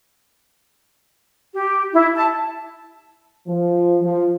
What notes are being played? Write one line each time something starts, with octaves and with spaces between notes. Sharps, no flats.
G4
E4
A5
F3
F3